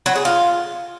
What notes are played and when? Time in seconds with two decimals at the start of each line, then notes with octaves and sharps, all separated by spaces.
0.06 F#3
0.15 G#4
0.25 F4